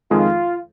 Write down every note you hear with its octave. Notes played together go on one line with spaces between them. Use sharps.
F2 D#3 G#3 D#4 F4 G#4